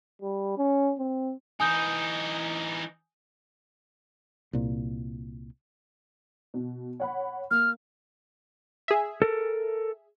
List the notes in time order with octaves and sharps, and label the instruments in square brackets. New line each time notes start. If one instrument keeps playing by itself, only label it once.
[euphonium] G3
C#4
C4
[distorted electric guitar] E3 D#4 [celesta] G#5 D#6 G6
[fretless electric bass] C2 A#2
[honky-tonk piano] B2
C#5 F#5 B5
[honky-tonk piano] A#3 [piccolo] F6
[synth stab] G#4 E5
[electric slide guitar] A4 A#4